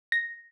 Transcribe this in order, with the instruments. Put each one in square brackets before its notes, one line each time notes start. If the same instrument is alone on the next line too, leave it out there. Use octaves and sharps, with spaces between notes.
[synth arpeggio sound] A#6